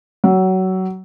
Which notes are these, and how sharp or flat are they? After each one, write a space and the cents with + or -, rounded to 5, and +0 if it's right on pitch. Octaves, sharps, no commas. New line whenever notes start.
F#3 +20